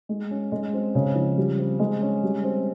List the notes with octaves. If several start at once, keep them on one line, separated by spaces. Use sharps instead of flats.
G#3
C#4
G#3
C4
C#3
F3
G3
C4
G#3
C#4
G3
C4